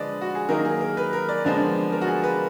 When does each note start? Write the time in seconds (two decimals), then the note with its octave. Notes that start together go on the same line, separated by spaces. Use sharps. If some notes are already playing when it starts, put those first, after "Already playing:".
Already playing: D3 F3 G#3 B4 D5 D#5
0.21 F#4
0.35 G#4
0.49 D#3 F#3 A#3 D#4 A#4
0.65 G#4
0.81 A#4
0.97 B4
1.13 A#4
1.29 D5
1.44 F2 D3 F3 G#3 B3
1.92 A#4
2.02 F#4
2.08 G#4
2.24 B4